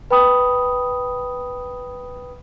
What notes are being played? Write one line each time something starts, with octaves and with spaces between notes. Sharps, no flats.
B4 G5 B5 D#6